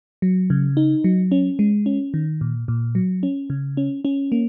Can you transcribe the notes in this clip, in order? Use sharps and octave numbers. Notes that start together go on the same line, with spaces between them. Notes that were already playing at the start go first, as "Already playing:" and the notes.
F#3
C#3
D#4
F#3
C#4
G#3
C#4
D#3
A#2
A#2
F#3
C#4
C#3
C#4
C#4
A#3